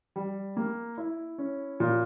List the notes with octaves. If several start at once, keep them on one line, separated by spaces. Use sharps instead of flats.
G3
A#3
E4
C#4
A#2